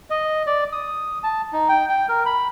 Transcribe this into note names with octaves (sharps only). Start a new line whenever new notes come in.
D#5
D5
D#6
A5
D#4
G5
G5
A#4
B5